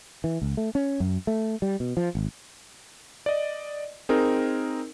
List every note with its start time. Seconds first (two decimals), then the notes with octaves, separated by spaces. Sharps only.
0.24 E3
0.42 C#2
0.57 A3
0.75 C#4
1.00 F#2
1.27 A3
1.62 G3
1.80 B2
1.97 F3
2.15 G#1
3.26 D5 D#5
4.09 C4 D#4 G#4 A#4